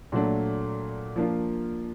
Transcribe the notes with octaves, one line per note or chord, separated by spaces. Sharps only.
A#2 F#3 A3 D4
F3 A#3 D4 F4